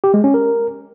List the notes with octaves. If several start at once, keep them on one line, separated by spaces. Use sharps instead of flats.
G4
G#3
C#4
A#4